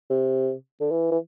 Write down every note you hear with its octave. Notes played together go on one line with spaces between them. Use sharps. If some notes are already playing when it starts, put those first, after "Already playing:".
C3
D3
E3
E3